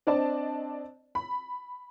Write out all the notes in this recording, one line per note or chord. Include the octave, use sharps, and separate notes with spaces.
C4 D4 D5 D#5 A5
B5